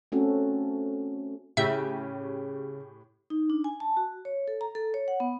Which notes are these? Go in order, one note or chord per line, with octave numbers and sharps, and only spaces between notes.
A3 C4 C#4 F#4 A4
A2 C#3 G4 E5 G6
D#4
D4
G#5
A5
F#4
C#5
A4
A#5
A4
C#5
F#5
B3